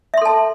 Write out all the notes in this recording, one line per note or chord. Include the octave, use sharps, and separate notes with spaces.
A4 E5 A5 C6